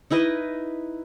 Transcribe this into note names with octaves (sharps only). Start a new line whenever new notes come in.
D#4 E4 B4 D#5